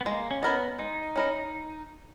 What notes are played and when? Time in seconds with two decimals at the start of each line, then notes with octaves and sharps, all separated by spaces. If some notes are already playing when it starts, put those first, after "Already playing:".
0.01 B3
0.05 G#3 A#3
0.31 C#4
0.42 B3 C#4 E4 A#4 D#5
0.79 G#3 D#4
1.16 C#4 E4 A#4 D#5